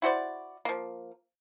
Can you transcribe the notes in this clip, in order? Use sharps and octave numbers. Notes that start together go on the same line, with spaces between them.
E4 F#4 C5 D5
F3 A#3